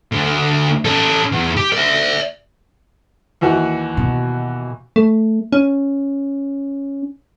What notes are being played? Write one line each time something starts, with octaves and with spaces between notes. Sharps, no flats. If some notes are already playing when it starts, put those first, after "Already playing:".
D2
C#4 A4
E2
G4
D5 E5
D#2 E3 F#4
B2
A3
C#4